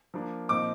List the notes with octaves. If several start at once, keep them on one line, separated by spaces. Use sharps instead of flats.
F3 A#3 D4
A#2 F3 C4 D#4 D6